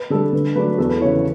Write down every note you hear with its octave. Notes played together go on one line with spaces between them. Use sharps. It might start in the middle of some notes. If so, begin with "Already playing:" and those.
Already playing: B4
D3 G3 A4
D3 B4
F#3 A3 D4 B4
E2 A4
B4
C#3 E3 C#5
B4